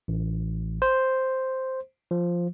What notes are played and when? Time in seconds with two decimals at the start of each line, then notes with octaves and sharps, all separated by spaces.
0.08 A1
0.82 C5
2.11 F3